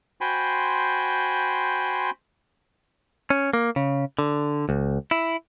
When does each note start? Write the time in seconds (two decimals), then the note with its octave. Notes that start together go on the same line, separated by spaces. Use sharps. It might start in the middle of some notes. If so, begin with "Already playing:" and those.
0.21 F#4 C5 G5 G#5 B5 C6
3.30 C#4
3.53 A#3
3.76 C#3
4.19 D3
4.69 C#2
5.11 E4